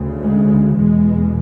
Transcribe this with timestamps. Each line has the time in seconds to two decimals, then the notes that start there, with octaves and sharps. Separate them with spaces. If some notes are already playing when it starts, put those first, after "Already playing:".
Already playing: D2 C#3
0.22 G#3
0.76 E2 B2 G#3